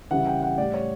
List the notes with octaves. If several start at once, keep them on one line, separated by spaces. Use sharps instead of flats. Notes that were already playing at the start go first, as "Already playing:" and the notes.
C#3 E3 G3 F#5
G5
F#5
A2 G3 D5
C#5